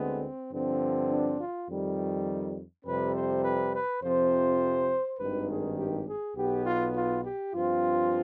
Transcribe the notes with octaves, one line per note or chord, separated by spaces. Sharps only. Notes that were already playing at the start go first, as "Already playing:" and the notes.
Already playing: D2 D3 G#3 B3 C4
G2 D3 F3 C4
D4
F4
F2 D#3 G3
F2 C3 G3 C4 B4
C5
B4
B4
F2 C3 F3 C4 C5
G#1 G2 D#3 B4
G#4
G4
G#4
B1 B2 B3 G4
F4
F4
G4
G2 F3 C4 F4